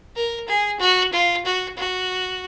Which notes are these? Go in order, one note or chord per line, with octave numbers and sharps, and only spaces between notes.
A#4
G#4
F#4
F4
F#4
F#4